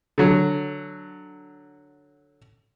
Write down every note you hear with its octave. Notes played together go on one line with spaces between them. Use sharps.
D3 F#3